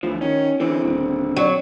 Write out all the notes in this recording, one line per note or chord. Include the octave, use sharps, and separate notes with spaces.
D2 E3 F3
D#3 C#4
D3 E3 C4
D#1
F#3